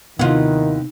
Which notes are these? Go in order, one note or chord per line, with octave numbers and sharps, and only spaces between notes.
D#2 C3 D#3 B3 E4 F4 F#5